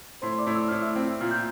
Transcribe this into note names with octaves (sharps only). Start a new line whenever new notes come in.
A2 C5 C6
D5 D6
A2
E6
A2 F6
E5 E6
C4
A#2 F6
G6